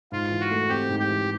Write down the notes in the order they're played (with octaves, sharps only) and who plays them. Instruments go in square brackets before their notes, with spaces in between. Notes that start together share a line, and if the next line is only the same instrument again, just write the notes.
[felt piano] G#2 [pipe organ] F4
[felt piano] E3
[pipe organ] F#4
[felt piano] A3
[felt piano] C4 [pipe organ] G4
[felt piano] G#2
[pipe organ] G4
[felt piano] E3